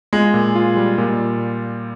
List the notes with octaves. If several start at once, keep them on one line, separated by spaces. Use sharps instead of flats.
G#3 F4
A#2
F4
G3
A#2